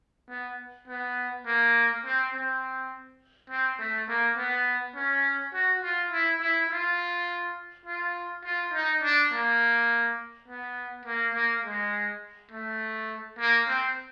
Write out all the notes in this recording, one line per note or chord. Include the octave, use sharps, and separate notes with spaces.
B3
B3
A#3
C4
C4
C4
A3
A#3
B3
C#4
F#4
F4
E4
E4
F4
F4
F4
D#4
D4
A#3
B3
A#3
A#3
G#3
A3
A#3
C4